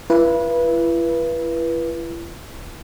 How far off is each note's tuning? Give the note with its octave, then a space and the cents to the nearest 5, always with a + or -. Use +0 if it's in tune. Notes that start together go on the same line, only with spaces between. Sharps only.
E4 +45 B4 -20